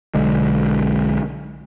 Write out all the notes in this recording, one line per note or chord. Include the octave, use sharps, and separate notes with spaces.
B1 D3 G#3